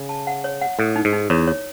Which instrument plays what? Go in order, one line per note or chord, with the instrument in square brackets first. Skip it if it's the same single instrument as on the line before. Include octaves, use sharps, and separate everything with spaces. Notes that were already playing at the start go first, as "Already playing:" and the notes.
Already playing: [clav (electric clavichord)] C#3
[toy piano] A5
F#5
C#5
F#5
[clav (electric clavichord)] A2 [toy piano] A4
[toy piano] D#4
[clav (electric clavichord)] G#2
[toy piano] D#4
[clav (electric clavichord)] E2 [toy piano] C#5
[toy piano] C#5